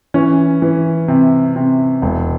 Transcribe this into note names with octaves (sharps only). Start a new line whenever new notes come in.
E3 C#4
E3
C3
C3
E1